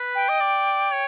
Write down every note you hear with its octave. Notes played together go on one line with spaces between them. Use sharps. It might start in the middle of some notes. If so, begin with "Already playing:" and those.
Already playing: B4
G5
D#5
D5
C#5